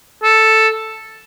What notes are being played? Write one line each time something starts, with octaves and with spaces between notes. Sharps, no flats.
A4